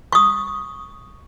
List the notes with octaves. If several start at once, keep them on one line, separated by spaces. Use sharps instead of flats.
C#6 D#6